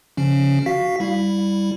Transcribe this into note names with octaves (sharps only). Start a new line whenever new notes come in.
C#3 F3 C#4
F#4 F5 B6
G3 E4